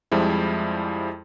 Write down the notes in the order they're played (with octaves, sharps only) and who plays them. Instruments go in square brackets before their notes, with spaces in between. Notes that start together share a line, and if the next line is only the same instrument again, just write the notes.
[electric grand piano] F2 F3 G3 G#3 E4